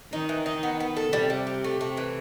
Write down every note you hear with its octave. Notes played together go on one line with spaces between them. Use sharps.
D#3 D#4
E3
D#4
B3
B3
A4
C3 G3
G3
G4
A3
C3 A3
E3